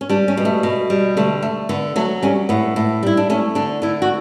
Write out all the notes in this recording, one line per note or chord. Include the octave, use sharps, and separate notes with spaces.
C#4
G3 D4
C#4
B2
A3
B2
G3
D3 A3
A3
D3 B3
F#3 A3
G3 C#4
A2 B3
A2
G3 E4
D4
A3 C#4
D3 D4
D3 E4
F#4